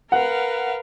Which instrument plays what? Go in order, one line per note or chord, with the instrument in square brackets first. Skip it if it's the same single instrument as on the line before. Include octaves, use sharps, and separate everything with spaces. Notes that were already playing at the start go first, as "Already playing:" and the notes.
[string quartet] A#4 B4 F5 [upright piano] F#5